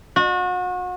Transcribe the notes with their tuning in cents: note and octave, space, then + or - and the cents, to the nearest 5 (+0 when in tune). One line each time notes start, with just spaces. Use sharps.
F#4 -35